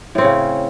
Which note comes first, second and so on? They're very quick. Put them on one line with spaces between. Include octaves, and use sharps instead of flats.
A2 C4 C#4 C#3